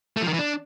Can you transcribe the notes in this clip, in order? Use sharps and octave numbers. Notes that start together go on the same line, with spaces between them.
A3
F3
D#3
E3
D4